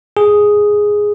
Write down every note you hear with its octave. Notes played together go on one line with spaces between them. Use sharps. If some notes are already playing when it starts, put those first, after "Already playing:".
G#4